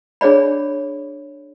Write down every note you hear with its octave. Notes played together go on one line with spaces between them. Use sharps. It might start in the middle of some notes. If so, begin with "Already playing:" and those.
D4 G#4 C#5 D5 B5